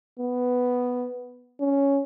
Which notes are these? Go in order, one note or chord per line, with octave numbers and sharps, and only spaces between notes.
B3
C#4